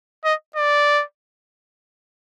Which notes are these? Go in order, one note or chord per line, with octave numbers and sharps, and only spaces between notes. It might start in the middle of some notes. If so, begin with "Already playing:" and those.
D#5
D5